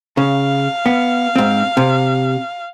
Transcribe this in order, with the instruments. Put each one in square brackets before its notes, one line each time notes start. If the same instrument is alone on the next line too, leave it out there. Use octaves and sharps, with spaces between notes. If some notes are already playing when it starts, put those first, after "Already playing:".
[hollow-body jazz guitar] C#3 [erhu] F5
[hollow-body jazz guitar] B3
G#2 C4
C3